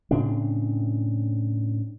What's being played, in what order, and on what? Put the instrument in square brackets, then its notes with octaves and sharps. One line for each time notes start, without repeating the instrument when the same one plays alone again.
[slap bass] A2 C#3 C4 D4